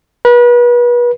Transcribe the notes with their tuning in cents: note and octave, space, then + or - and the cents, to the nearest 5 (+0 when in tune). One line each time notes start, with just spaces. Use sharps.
B4 -35